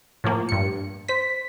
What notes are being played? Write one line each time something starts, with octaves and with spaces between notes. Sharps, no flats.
A2 F3 A#3
G2 C#7
C5 B6